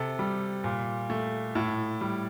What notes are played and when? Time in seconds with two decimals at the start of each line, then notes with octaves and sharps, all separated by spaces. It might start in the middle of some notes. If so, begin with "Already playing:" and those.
Already playing: C3 A4
0.19 G3
0.64 A#2
1.10 A3
1.55 A2
2.01 G3